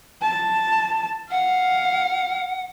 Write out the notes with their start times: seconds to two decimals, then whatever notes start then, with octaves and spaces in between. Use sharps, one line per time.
0.22 A5
1.31 F5 F#5